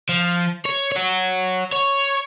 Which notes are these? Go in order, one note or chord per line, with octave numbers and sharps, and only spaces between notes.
F3
C#5
C#5 F#5
C#5